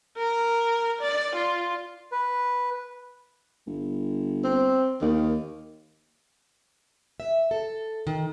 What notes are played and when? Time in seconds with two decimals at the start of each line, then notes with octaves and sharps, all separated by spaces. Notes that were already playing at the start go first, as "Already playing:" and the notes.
0.18 A#4
1.01 D5
1.35 F4
2.12 B4
3.67 G1
4.44 C4
5.01 D#2 D#3
7.20 E5
7.51 A4
8.07 D#3